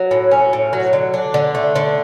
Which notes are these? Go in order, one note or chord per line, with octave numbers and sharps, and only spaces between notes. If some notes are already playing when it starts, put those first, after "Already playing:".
Already playing: F#3
A2
C#4
A2
F#3
D3
D4
D3
A3
D3